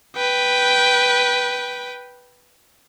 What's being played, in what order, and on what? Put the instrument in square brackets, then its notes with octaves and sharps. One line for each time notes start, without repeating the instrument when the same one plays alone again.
[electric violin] B4 G5